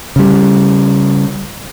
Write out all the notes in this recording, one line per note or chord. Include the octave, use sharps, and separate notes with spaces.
C#3 G3